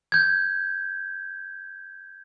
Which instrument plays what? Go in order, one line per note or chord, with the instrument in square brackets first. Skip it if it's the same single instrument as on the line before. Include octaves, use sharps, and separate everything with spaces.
[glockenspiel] G6 G#6